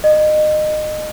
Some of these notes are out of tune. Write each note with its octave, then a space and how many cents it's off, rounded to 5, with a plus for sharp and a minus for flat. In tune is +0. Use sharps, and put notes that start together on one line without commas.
D#5 -25